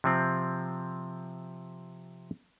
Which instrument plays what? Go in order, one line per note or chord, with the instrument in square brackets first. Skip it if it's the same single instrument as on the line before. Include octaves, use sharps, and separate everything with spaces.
[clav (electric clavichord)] C3 F3 C4